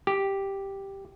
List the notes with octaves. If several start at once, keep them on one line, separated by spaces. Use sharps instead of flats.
G4